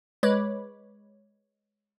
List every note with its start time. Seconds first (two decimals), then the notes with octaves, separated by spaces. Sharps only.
0.23 G#3 B4 C#5 B5 D6